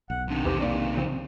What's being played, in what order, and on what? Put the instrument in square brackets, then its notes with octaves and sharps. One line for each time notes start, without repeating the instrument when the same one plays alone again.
[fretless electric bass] B1 [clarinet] F#5
[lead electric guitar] C3 D#3 [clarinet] D4
[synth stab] E2 E3 C4 [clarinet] G4
[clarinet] A#3 [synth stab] D4 D5
[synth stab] C#3 F3 C4